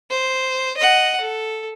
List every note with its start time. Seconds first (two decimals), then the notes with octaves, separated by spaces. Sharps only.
0.11 C5
0.77 D#5 F#5
1.20 A4